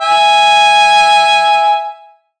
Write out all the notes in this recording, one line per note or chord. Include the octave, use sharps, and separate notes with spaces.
E5 G#5